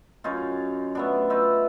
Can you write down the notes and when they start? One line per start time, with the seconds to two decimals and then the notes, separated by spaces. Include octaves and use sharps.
0.24 F#2 C#4 D#4 F4
0.95 A3 B3 D4
1.30 D#4 F4 B4 E5